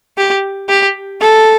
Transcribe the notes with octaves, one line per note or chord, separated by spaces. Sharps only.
G4
G4
A4